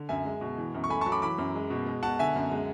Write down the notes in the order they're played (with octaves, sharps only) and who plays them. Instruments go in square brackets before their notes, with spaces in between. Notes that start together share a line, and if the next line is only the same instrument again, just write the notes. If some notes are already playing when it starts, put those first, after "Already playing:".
Already playing: [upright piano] D3
[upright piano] F#2 [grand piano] E5 G#5
[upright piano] G#3
B2
E3
F#2
[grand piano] C#6
[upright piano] A3 [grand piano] G#5 B5
[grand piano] A5 C#6
[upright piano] F#3
[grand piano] B5 D6
[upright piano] E3 [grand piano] B5 D6
[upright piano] F#2
G#3
B2
G#3
[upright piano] B2 [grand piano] F#5 A5
[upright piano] D3 [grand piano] E5 G#5
[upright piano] F#2
G#3